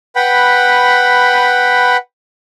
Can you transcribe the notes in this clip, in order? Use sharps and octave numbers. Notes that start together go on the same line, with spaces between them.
B4 F#5 G5 B5